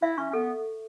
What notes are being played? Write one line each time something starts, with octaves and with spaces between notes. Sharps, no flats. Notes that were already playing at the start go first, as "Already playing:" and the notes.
E4 E5
C#4 C#6
C#4
B3 A4